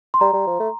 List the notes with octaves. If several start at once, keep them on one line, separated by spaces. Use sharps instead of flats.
C6
G3 A#5
G3
F3
A3